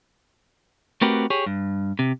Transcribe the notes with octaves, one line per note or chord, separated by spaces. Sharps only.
A3 C4 F#4 G4 A#4 B4
G4 G#4 C#5
G2
C3